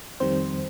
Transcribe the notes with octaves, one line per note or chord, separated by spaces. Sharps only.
F2 D#3 G3 C4 C5